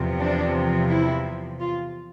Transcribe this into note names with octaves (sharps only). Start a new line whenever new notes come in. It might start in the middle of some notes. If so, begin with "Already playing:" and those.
Already playing: E2 C3 F3
D4
E4
F4